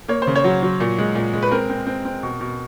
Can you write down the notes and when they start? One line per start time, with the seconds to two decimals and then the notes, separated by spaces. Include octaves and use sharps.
0.08 A#3 C#5
0.22 C5
0.27 C#3
0.36 C#5
0.44 F#3
0.63 F#3
0.80 A#2
0.98 G#3
1.15 A#2
1.33 G#3
1.42 B4
1.51 C4 A#4
1.70 C4
1.86 C4
2.05 C4
2.23 B2
2.40 B2